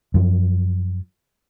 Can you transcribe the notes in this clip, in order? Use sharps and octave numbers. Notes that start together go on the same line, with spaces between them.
F#2 F3